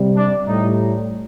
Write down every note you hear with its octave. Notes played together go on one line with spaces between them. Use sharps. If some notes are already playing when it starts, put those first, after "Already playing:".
Already playing: C3 G3
D4
A2 G3 D#4